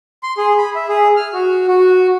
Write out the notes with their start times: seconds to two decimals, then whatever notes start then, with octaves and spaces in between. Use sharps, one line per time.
0.23 C6
0.38 G#4
0.58 B5
0.75 E5
0.89 G#4
1.17 F6
1.33 F#4
1.68 F#4